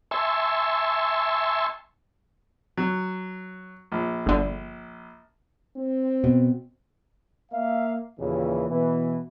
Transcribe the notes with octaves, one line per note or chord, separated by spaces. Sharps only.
E5 G#5 A5 C6 C#6 E6
F#3
A#1
G1 D3
C4
B2
A#3 E5 F5
D#2 A#2 C#3 E3
B2 E3